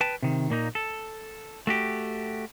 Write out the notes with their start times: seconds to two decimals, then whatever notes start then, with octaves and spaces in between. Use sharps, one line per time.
0.01 B4 G5 A5
0.23 C3 D#3
0.50 A#2 A#3 D#4
0.75 A4
1.67 A3 F#4 G4